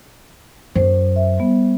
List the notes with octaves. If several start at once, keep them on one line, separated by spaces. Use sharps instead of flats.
F#2 C5
E5
G3 B3